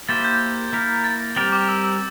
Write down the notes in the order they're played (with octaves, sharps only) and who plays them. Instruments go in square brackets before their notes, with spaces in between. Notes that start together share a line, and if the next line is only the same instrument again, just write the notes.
[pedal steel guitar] A#3 E4 G4 C5 [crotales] A6
[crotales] G6
[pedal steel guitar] A#3 E4 A#4
[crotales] A6
[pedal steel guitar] G3 C4 G4 A#4 [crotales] A6
[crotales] D6
E6
E6